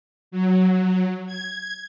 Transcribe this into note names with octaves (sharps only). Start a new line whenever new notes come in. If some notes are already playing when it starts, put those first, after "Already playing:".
F#3
G#6